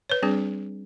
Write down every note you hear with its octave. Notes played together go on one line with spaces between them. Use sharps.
B4 C#5
G3 C4 D4 G#4